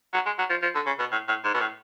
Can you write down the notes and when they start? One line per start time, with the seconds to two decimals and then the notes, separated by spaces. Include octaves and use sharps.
0.13 F#3
0.26 G#3
0.38 F#3
0.50 F3
0.62 F3
0.75 D3
0.86 C#3
0.99 B2
1.12 A2
1.28 A2
1.44 G#2
1.54 B2
1.60 A2